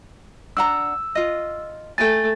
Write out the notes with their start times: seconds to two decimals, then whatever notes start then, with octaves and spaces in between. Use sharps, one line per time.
0.57 D4 F#5 A#5 E6
1.15 F4 D#5
1.98 A3 G5 G#5 A6